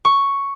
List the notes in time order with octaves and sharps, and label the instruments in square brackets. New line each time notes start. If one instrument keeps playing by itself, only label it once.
[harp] C#6